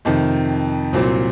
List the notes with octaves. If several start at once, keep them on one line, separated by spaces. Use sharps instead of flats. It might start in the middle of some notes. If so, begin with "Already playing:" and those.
F2 C3 D#3
C2 A#2 F#3 C4